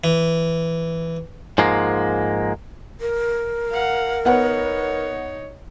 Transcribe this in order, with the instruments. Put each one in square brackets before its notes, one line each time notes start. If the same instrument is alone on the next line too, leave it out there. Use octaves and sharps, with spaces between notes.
[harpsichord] E3
[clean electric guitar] G#2 F3 G#3 A#3
[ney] A#4
[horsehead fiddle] F5 F#5
[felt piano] B3 F#5 [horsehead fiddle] D#4 C#5